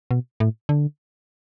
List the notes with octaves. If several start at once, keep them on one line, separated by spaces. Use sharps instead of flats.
B2
A2
D3